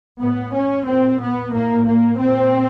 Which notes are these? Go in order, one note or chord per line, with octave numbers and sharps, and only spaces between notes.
A2 B3
C#4
A#2 C4
B3
A2 A#3
A#3
A#2 C4